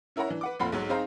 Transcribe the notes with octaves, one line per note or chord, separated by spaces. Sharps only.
C#4 E4 A#4 C#5 F#5 A#5
E3 D4
B4 F#5 D6
F1 A#2 C4 F4 F#5 B5
B1 G#2 F#3
C4 D#4 G#4 C5 F5 A#5